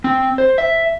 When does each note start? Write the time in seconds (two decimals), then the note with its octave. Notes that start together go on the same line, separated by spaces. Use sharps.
0.04 C4
0.38 C5
0.58 E5